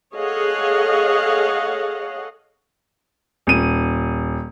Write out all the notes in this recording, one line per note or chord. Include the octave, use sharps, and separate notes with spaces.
G#4 A4 C#5 D#5 F5 F#5
D#1 D#7